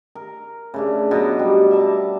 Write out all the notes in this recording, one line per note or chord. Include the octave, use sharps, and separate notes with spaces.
A#4
C#3 A3 D4
B2 F#3 B3
G3
E5 A5 A#5